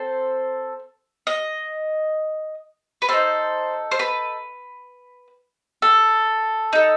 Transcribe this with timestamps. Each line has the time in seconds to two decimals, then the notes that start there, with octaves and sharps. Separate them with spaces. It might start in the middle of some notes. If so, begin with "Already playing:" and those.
Already playing: C4 A4 C5
1.27 D#5
3.02 B4
3.09 D#4 A4 C5
3.91 C5
3.99 B4
5.82 A4
6.73 D#4 A4